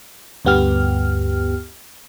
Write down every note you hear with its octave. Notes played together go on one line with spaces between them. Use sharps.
D2 G2 B3 G4 F6